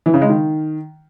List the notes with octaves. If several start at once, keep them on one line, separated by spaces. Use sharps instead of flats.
E3
C#3
G#3
D#3